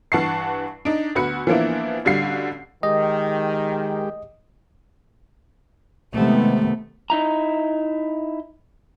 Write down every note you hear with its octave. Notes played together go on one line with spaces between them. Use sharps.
G2 E3 F#5 A5 C#6 C7
D4 D#4
D2 B3 F#4 B5 C#7
E3 F3 A#3 B3 D4 E4
A1 D3 G3 F#4 F5 C7
D#3 G#3 G4 D#5
C3 D#3 G#3 A3 B3
D#4 E4 A#5